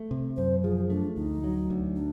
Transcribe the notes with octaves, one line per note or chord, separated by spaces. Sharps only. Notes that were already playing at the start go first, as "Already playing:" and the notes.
Already playing: A3
C3
F#2 C5
F3 G#4
A3 D4
D2 D#4
F#3
D2
D4